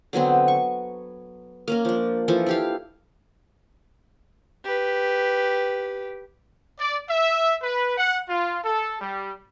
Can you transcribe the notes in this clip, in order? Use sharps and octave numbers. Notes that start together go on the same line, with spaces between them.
D3 F#3 B3 C4
C#6
A#3 C#4 A#4
F3 D4
E3 F3 A4
E4 G4 F5
G4 B4
D5
E5
B4
F#5
F4
A4
G3